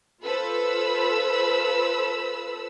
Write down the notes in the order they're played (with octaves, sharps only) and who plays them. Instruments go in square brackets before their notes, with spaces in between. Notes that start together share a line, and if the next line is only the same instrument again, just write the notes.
[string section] F4 A4 B4 C5 B5 E6